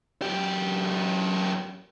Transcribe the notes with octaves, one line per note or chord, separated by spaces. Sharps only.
F#2 G4